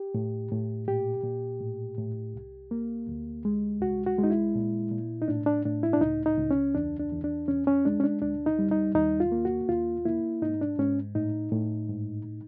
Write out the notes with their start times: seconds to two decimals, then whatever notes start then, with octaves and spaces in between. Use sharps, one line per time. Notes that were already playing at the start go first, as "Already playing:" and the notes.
Already playing: G4
0.14 A2
0.51 A2
0.88 A#2 G4
1.24 A#2
1.61 A2
1.98 A2
2.34 C2
2.71 A#3
3.09 D2
3.45 G#3
3.81 C2 F#4
4.06 F#4
4.19 G#3 D#4
4.30 E4
4.55 A#2
4.91 A#2
5.22 D#4
5.28 A2 D4
5.46 D4
5.65 A2 D4
5.83 E4
5.93 D4
6.01 C#2 D#4
6.26 D#4
6.38 C#2
6.51 C#4
6.75 E2 D4
7.00 D4
7.12 E2
7.24 D4
7.48 E2 C#4
7.67 C#4
7.85 G#3 D4
8.00 C#4
8.04 D4
8.22 D2 D4
8.46 D#4
8.59 G3
8.71 D#4
8.95 D#2 D#4
9.20 F4
9.32 A#3
9.45 F#4
9.69 D#2 F4
10.05 A#3 E4
10.42 G#2 D#4
10.61 D4
10.79 G#2 C#4
11.15 A2 D#4
11.52 A2
11.89 G#2